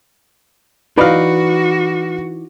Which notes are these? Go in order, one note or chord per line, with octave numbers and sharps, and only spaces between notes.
E3 D#4 F#4 B4 D5 D#5 F5